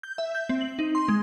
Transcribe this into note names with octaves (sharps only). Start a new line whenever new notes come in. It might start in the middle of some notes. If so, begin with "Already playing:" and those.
G6
E5
G6
C4
F#7
D#4
C6
G#3